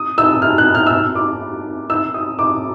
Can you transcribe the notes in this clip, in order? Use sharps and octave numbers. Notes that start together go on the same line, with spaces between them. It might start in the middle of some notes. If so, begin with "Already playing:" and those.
Already playing: D#6
E6
F6
F#6
F6
E6
F6
D6
E6
D#6
D6